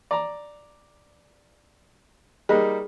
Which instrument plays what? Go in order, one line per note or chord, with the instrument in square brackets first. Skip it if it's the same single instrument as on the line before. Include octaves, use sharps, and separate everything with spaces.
[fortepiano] D5 A#5
[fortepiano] G3 A#3 D#4 [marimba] G#4